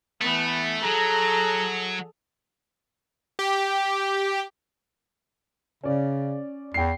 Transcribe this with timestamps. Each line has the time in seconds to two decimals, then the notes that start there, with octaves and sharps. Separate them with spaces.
0.21 E3 A3 B3
0.84 F#3 G#4 A4 A#5
3.39 G4
5.84 C#3 C#4 D5
6.74 E2 G5 C7